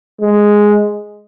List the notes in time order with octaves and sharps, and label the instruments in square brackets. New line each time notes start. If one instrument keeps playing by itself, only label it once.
[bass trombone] G#3